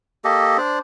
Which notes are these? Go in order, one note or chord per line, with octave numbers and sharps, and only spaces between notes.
A#3 G4 A4 D#5
D4 C5 D5